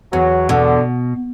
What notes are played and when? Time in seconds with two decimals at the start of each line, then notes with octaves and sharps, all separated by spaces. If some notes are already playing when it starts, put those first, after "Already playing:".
0.12 E2 F#3
0.49 B2 D3